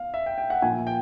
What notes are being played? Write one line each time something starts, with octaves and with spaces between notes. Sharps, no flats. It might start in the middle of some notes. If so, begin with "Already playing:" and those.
Already playing: B3 F5
E5
G5
G5
F#5
A#2 F3 A#3 G#5
G5